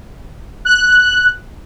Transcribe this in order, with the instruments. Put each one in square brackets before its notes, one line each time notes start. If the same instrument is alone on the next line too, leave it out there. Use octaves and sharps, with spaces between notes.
[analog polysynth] F#6